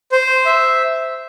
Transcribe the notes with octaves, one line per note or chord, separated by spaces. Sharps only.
C5
E5